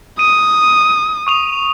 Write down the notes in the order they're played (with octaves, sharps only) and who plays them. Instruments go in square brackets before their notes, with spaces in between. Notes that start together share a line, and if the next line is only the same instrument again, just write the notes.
[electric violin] D#6 [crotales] D#7
[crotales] C#6 D#6 F7